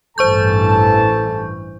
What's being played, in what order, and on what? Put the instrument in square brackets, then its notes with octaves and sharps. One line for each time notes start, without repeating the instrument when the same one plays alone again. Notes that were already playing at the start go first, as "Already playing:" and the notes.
[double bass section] A1 G2 E3 [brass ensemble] A4 A5 [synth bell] C5 C#6 G6